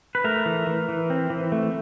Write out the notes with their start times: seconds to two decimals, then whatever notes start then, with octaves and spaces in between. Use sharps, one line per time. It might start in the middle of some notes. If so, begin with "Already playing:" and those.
0.15 B4
0.24 A3 A#4
0.46 E3
0.67 E3
0.89 E3
1.10 C4
1.30 E3
1.52 A3